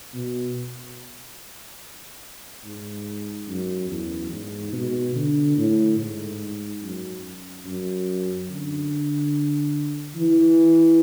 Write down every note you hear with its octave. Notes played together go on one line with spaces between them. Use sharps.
B2
G#2
F#2
E2
G#2
B2
D3
A2
G#2
F#2
F#2
D3
E3